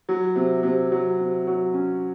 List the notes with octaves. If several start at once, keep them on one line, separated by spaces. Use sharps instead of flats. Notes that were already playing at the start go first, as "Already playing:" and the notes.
F#3
C3
C3
F#3
C3
F#3
C#4